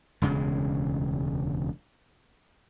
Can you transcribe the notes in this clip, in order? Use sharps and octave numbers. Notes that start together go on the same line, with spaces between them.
E1 D2 C#3 G#3